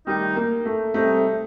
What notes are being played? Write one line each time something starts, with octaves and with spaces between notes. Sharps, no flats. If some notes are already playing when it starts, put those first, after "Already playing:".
D#3 G3 A3 D#4
A#3
A3
C3 G3 A3 C4 D#4